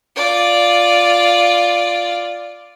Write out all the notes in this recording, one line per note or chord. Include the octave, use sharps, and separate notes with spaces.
F4 D5